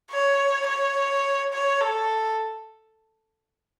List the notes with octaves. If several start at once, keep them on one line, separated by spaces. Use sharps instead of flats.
C#5
C#5
C#5
A4